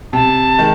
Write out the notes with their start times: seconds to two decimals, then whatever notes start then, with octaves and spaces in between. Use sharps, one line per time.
0.13 C3 A5
0.59 D#3 G#3